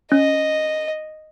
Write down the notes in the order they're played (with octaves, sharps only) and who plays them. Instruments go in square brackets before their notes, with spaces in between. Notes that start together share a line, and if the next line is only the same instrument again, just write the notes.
[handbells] C#4 [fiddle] D#5